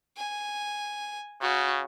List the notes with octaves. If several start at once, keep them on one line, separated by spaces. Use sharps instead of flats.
G#5
C#3 F#4